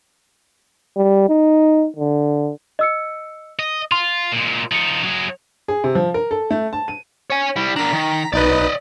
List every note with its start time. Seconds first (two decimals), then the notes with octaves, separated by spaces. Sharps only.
0.96 G3
1.29 D#4
1.96 D3
2.79 D#5 E6 C#7
3.59 D#5
3.92 F4 C6 F7
4.32 A#2 G#3
4.72 F3 D#4 C#7 F#7
5.04 F#3 G#4
5.68 G#4
5.84 C3
5.95 F3
6.14 A#4
6.31 A4
6.51 A3
6.73 A5
6.88 D#7
7.30 C#5 G#5
7.56 G3 E4
7.76 D4 A#4 A#5 B6
7.93 D#3
8.33 B1 D#4 B4 D5 D#5